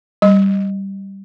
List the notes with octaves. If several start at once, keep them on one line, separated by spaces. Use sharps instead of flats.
G3 D#5